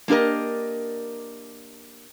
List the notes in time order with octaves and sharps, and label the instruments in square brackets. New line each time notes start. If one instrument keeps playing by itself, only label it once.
[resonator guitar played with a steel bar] A#3 D4 G4 A#4 D#5